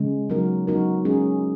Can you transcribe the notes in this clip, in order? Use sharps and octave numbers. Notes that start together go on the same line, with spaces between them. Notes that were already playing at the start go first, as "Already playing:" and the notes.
Already playing: C#3 G#3 C#4
F#3 B3 D#4 F#4 A#4
F#3 B3 D#4 F#4 A#4
G#3 C#4 G#4